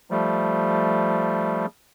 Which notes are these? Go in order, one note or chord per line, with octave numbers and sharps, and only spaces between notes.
F3 G3 A3